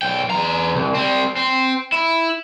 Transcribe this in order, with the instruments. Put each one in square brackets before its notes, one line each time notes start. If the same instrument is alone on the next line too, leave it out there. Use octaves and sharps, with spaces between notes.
[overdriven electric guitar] B1 G5
E2 A#5
C2
G3 C4
C4
E4